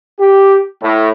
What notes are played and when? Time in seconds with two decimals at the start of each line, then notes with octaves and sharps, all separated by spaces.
0.20 G4
0.82 A2